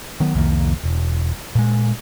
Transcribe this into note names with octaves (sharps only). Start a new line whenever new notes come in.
D#3 F#3 B3
C2 F2 D#3 A#3
E1
A#2 G#3